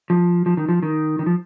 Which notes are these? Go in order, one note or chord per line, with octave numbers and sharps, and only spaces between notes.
F3
F3
D#3
F3
D#3
D#3
F3